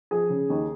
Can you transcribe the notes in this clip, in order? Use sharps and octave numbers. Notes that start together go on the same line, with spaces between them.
F3 G#4
C#3
D#2